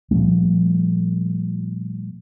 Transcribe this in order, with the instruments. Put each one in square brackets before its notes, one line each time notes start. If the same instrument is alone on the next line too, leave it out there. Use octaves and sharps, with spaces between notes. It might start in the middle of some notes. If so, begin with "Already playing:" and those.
[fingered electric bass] A#2 F3 G3 A3